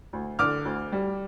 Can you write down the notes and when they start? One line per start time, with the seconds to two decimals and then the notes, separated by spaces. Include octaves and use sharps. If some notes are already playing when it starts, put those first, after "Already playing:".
0.13 D2
0.39 D3 D6 F6
0.65 D2
0.92 G3